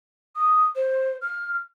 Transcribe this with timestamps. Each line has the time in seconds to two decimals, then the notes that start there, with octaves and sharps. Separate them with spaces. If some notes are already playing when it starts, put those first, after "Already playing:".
0.36 D#6
0.75 C5
1.21 F6